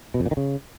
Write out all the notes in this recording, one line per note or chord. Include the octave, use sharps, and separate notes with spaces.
B2
F2
A#2
D#3
C#3